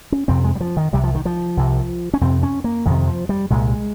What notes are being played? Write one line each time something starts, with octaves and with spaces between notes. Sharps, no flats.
C#4
F2 C3 C4
G#3
G3
F3
D#3
C2 C3 G3
F3
D#3
F3
C2 C3
C#4
F2 C3 C4
C#4
A#3
F2 C3 D#3
F3
G3
C2 A#2 G#3